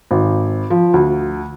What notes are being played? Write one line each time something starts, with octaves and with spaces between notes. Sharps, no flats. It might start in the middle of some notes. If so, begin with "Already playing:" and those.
G#1
F3
D2